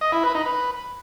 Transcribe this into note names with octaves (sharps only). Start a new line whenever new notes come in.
D#5
E4
B4
D#4
B4